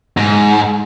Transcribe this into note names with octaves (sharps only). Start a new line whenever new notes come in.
G#2